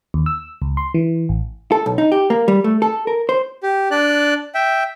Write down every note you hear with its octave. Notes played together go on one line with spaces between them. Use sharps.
D#2
E6
C#2
C6
E3
A1
A4
B1
D#4
G4
A#3
G3
A3
A4
A#4
C5
G4
D4 D5 F#6
E5 G5